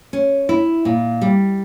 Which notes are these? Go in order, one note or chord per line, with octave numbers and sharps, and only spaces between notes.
C#4
E4
A#2
G3